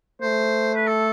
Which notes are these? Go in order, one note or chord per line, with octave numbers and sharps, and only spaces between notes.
A3 C5
B4
A4